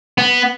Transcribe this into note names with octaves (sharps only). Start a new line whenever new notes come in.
B3